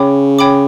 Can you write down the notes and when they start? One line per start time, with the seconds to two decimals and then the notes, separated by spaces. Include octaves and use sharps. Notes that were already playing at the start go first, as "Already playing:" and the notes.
Already playing: C#3 C#5 G5 B5 D6
0.39 C#5 G5 B5 D6